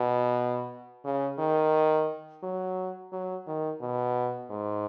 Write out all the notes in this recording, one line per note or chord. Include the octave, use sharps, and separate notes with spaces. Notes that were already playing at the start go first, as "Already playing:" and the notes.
Already playing: B2
C#3
D#3
F#3
F#3
D#3
B2
G#2